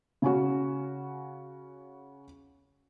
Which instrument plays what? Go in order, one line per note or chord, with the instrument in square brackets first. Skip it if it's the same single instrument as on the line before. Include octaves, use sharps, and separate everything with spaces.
[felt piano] C#3 C#4 F#4